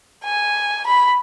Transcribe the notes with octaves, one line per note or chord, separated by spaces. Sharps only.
G#5
B5